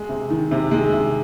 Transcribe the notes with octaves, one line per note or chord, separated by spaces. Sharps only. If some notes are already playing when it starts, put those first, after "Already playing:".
Already playing: G#3
C3
D#3
C3
G#3
C3